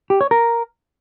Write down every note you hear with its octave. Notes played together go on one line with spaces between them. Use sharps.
G4
C#5
A#4